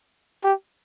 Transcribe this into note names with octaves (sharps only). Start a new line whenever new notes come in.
G4